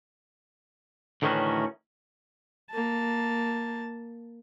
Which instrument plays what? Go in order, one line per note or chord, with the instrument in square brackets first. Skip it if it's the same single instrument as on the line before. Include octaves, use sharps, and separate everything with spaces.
[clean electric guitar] D2 A2 D#3 E3 C#4 F#4
[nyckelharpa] A#3 A5